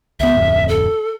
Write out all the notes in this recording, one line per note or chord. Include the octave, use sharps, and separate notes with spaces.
C#2 B3 E5
D1 F2
A4